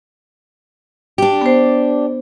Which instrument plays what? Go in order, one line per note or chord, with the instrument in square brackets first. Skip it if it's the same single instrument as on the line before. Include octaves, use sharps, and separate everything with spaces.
[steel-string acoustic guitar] D4 G4
[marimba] B3 C5